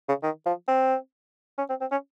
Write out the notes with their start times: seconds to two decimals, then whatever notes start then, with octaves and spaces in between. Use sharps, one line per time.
0.08 C#3
0.23 D#3
0.46 F3
0.68 C4
1.58 C#4
1.70 C4
1.81 C4
1.92 C#4